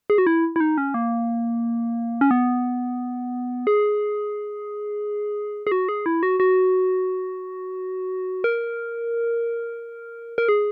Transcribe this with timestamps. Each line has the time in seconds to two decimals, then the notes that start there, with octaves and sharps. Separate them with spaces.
0.10 G#4
0.18 F#4
0.27 E4
0.56 E4
0.60 D#4
0.78 C#4
0.94 A#3
2.21 C#4
2.31 B3
3.67 G#4
5.67 G#4
5.72 F#4
5.89 G#4
6.06 E4
6.23 F#4
6.40 F#4
8.44 A#4
10.38 A#4
10.49 G#4